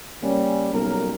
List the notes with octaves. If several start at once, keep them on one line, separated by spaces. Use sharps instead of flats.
G3 A#3 C#4
B1 G3 A#4